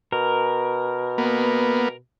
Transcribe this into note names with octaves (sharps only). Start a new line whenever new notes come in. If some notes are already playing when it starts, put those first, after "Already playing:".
B2 A#4
A#3 B3